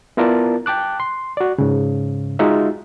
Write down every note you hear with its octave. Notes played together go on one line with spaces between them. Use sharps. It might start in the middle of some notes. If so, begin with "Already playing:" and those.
B3 E4 F4 A#4 D5 A5
G5 A5 D6 F#6
C6
F#4 D5
G#2 C#3
G#3 D#4 F4 F#4 E5